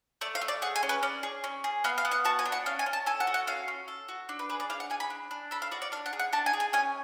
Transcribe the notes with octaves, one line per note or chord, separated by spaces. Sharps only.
A3 D5
F5
A3
D5
G#4 F#5
G#5
C#4
B4
C#4 D5
G#4
C#4
G#4
B3 F5
F5
B3
F#5
F#4 A5
G#5
D4
F#5
C#4 F5
G#5
C#4
A5
A4 G#5
F#5
F#4
F#5
C#4 F5
C#4
A4
F#4
D4
B4
G#4 B4
D5
D4 F5
F#5
G#4 G#5
B5
D4
D4
A4 B5
F5
F#4 D5
D5
D4 F5
F#5
G#4
F#5
D4 A5
G#5
G#4
G#5
C#4 G#5